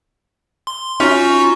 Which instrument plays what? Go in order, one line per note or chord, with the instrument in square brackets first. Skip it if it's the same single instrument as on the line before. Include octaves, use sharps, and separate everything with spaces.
[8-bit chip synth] C6
[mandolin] C#4 [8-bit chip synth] D#4 F4 F#4